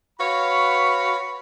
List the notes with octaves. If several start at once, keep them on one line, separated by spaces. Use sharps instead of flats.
F#4 B4 C#5 F5 B5